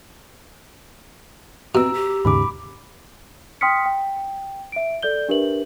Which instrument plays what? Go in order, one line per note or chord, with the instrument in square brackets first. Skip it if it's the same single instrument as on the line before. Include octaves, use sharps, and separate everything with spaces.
[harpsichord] B2 [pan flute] C4 [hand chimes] A#5 E6
[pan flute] G4
[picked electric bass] D#2 G#2 C#3 [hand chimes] B5 D6
[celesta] G5 C6 D#6 F6 B6 C#7
G5
E5 D7
A4 D5 G6 G7
D4 G4 A#4 B4 E5 F#7